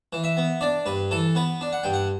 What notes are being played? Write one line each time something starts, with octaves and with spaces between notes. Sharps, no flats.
E3
E5
B3
D4 D5
G2 B4
E3 A4
B3 B4
D4
F#5
G2 G5
F#5